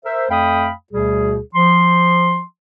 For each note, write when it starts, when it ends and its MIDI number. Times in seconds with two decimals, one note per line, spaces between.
0.05 0.26 70
0.05 0.26 72
0.05 0.26 76
0.30 0.71 41
0.30 0.71 57
0.30 0.71 77
0.30 0.71 79
0.30 0.71 83
0.30 0.71 87
0.92 1.39 38
0.92 1.39 47
0.92 1.39 55
0.92 1.39 68
1.55 2.42 53
1.55 2.42 84